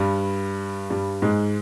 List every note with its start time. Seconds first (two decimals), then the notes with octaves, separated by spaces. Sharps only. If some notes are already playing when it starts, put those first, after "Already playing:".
Already playing: G2 G3
0.90 G2 G3
1.22 G#2 G#3